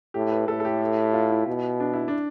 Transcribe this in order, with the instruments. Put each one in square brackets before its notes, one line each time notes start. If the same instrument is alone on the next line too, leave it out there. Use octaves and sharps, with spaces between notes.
[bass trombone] A2 [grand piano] G4
[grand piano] B4
[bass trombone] A2 [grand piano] A4
[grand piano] A4
G4
F4
E4
[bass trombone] B2
[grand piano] D4
E4
D4